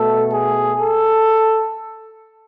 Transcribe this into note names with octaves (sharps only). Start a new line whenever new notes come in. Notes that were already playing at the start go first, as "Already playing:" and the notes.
Already playing: B2 A3 A4
G#4
A4